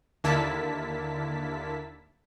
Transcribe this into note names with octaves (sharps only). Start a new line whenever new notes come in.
D#2 D3 A#3 E4 A5 B6